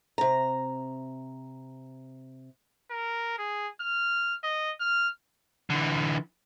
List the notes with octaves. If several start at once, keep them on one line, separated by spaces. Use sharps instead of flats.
C3 A#5
A#4
G#4
F6
D#5
F6
D3 E3